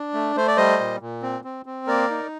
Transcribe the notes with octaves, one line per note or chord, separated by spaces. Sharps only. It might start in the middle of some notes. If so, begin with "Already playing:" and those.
Already playing: D4
A3
A3 C5
D5
G3 C5 D#5
A#2
A#2
C4
C4
C4
A#3 A#4 D5
D#4